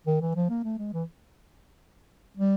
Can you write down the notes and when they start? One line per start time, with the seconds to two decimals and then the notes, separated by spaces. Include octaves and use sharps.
0.07 D#3
0.21 E3
0.36 F3
0.50 A#3
0.64 A3
0.79 G#3
0.93 E3
2.37 G3